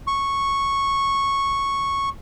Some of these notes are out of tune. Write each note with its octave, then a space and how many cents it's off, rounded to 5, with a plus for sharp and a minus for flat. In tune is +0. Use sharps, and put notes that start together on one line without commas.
C#6 -5